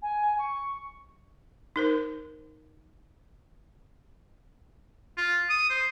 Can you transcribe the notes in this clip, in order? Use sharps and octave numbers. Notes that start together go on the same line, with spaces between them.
G#5
C#6
D#4 A#4 C5
F4
D#6
C5